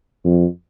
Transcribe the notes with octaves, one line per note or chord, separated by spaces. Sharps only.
F2